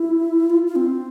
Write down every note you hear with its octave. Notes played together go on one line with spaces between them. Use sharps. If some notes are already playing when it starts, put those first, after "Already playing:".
Already playing: E4
F4
F4
C4